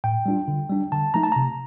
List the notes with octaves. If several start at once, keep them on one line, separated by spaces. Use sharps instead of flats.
A2 G5
G3 D4 F4
D3
G3 D4
D3 A5
F3 A3 D#4 A#5
A5
C3 A#5